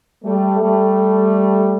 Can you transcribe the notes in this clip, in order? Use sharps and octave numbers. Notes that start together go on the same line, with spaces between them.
G3 A3
G3 A3